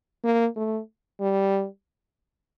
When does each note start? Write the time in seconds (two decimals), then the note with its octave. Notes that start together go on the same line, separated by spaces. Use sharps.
0.24 A#3
0.56 A3
1.20 G3